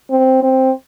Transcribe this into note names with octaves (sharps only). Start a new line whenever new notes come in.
C4
C4